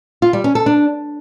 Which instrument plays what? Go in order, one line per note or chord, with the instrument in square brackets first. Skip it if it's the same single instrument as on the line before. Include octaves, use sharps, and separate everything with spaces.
[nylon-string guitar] F4
G3
C#4
A4
D4